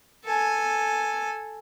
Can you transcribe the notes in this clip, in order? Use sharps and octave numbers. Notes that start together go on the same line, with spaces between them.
A4 G#5